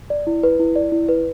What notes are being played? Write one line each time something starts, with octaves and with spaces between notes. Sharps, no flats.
D5
E4
B4
E4
D5
E4
B4